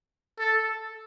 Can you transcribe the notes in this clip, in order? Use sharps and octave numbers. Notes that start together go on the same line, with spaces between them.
A4